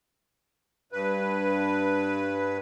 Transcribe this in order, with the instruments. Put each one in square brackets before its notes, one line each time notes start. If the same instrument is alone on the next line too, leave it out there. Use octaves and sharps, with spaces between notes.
[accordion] G2 B4